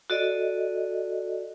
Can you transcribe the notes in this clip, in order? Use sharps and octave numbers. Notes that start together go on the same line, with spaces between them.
F#4 A4 D5 D#5